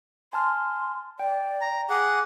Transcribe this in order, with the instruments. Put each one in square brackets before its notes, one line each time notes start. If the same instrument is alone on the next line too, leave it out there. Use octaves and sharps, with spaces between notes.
[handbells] G#5 A5 F6 [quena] C6
[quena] D5 [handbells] G5
[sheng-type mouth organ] A#5
[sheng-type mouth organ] G#4 F#5 [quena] D6